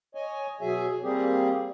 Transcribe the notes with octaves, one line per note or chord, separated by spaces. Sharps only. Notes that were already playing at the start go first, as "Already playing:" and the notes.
C#5 D#5 G#5
B2 F#3 G#4 E5 G#5
G3 A#3 C4 G4 G#4